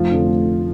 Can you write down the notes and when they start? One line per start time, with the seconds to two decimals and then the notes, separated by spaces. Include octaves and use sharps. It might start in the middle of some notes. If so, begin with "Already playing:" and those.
Already playing: F1 F3 F4
0.11 F2 D3 A3